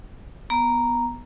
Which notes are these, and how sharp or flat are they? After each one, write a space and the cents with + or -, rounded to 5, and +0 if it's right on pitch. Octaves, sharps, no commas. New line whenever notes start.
B3 -5 A#5 +0